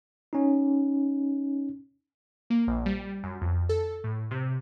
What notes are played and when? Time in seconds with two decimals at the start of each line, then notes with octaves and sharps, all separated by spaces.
0.33 C#4 D#4
2.50 A#3
2.67 A#1
2.86 G3
3.23 F#2
3.41 F2
3.69 A4
4.04 A2
4.31 C3